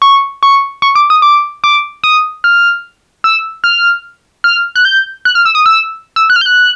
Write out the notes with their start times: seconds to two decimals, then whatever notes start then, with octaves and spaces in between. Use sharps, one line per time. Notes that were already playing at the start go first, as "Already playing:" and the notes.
0.02 C#6
0.43 C#6
0.82 C#6
0.95 D6
1.10 D#6
1.22 D6
1.64 D6
2.04 D#6
2.44 F6
3.24 E6
3.64 F6
4.44 F6
4.75 F#6
4.85 G6
5.25 F#6
5.35 F6
5.45 E6
5.55 D#6
5.66 E6
6.16 E6
6.30 F#6
6.36 F6
6.41 G6
6.46 F#6